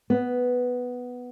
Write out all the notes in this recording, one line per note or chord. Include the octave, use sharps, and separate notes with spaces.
B3